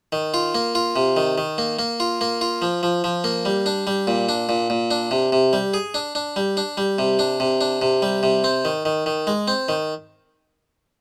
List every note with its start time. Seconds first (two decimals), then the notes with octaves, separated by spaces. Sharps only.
0.12 D#3
0.34 F4
0.55 A#3
0.75 F4
0.96 C3
1.17 D#3
1.38 D#3
1.58 A#3
1.79 A#3
2.00 F4
2.21 A#3
2.41 F4
2.62 F3
2.83 F3
3.04 F3
3.24 A#3
3.45 G3
3.66 D4
3.87 G3
4.07 A#2
4.29 D4
4.49 A#2
4.70 A#2
4.91 D4
5.11 C3
5.32 C3
5.53 G3
5.74 G#4
5.94 D4
6.15 D4
6.36 G3
6.57 D4
6.77 G3
6.98 C3
7.19 D4
7.40 C3
7.61 D4
7.82 C3
8.02 G3
8.23 C3
8.44 C4
8.65 D#3
8.85 D#3
9.06 D#3
9.27 G#3
9.48 C4
9.69 D#3